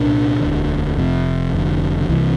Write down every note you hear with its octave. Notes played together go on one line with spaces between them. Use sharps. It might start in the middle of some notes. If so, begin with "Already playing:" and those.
Already playing: C2 A#2 D4
E1 D2 D3
F1 F2 C3
F1 F2 D3
D3
C2 C3 E3